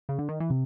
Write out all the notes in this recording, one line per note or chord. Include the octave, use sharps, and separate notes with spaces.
C#3
D3
D#3
E3
C3